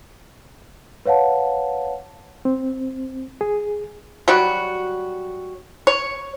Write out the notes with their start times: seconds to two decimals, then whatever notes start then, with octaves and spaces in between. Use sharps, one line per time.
1.05 B4 C#5 F5 F#5 A5
2.45 C4
3.41 G#4
4.28 F#3 G3 F#4
5.87 C#5